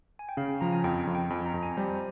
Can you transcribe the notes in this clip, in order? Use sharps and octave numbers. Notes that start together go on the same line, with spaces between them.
G#5
G5
C#3 F5
G5
F3 A#5
G#5
F2 G5
G5
F2
G5
F2 G#5
A#5
F2
G#5
G3 C5